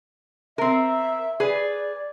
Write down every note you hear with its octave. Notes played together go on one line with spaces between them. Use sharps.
C4 A#4 E5
G#4 B4 D5